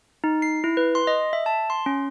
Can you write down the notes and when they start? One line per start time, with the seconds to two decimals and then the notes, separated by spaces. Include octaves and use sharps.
0.24 D#4
0.42 C7
0.64 E4
0.77 B4
0.95 C6
1.07 D#5
1.33 E5
1.46 A5
1.70 C6
1.86 C#4